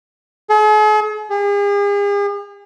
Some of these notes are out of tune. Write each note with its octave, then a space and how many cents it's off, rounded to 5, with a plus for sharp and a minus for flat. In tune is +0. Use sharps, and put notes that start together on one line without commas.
G#4 +45
G#4 -45